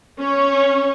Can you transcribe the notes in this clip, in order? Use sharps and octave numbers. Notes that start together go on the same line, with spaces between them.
C#4 C#5